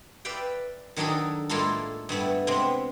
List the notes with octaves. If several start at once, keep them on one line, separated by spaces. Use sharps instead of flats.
B4 D5 E5 F5 G5
D#3 F#3 D4 D#4 G#4 A4
A2 G#3 A#3 E4 F4 A4
G2 A3 B3 E4
C3 G#3 B3 C4